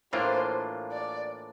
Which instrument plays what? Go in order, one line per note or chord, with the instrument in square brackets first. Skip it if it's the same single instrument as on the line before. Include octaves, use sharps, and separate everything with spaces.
[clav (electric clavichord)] A2 E3 A#3 D4 F4 [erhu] C5
[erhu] D5